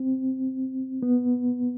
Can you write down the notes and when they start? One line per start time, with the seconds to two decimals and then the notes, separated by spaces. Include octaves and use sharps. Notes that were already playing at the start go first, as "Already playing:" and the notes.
Already playing: C4
1.03 B3